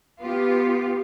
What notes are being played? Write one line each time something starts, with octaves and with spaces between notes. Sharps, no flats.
B3 F4 G4